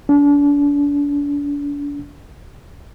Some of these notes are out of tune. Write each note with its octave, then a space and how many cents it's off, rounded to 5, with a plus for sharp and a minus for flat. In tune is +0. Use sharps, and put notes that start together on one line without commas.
D4 -40